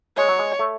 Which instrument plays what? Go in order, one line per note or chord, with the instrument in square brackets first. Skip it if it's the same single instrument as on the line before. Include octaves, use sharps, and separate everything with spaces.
[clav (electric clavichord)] G#3 [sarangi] C#5
[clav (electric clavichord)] F#3
G#3
A3